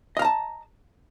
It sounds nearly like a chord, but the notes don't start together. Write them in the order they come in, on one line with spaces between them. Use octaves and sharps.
D#5 F5 A#5 A5